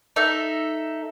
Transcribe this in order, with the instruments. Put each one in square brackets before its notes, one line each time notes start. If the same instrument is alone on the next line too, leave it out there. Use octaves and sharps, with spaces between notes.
[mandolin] D#4 A4 E5